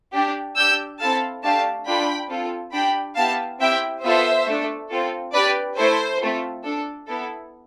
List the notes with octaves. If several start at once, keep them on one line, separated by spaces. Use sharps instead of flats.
D4 G4
D4 G4 E6 G6
C4 E4 A4 F5 A5
A3 D4 G4 F5 A5
D4 F4 A4 G5 B5
C4 F4 A4
D4 G4 G5 B5
B3 E4 G4 F5 A5
C4 E4 G4 E5 G5
B3 F4 A4 C5 E5
A3 D4 A4
C4 F4 A4
D4 G4 B4 D5
A3 E4 A4 C5
A3 C4 F4 A4
D4 A4
B3 E4 A4